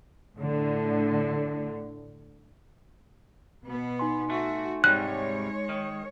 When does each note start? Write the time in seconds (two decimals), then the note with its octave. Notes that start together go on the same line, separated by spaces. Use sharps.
0.38 A2 D3
3.64 B2 B3
3.99 D#4 G#5 C6
4.30 A3 F#4
4.84 G#2 C3 G3 G#3 C#5 F#6
5.69 D#3